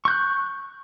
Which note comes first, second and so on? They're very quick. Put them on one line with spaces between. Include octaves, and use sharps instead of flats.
C#6 G6 F#6